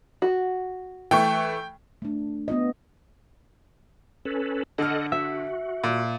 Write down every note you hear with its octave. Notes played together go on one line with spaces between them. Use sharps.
F#4
E3 A3 G5 C#6
A3 D4
B3 F4 D#5
C#4 A4 B4
D3 A4 D#5 F#5 F6
F#4 E5
A#2